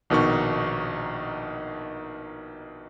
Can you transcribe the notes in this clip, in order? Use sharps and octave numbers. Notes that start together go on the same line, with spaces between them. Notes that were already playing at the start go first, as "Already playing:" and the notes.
A#1 B2 D#3 D#4 C#6